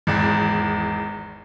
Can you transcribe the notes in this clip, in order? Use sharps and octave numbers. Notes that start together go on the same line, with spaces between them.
G#1 E2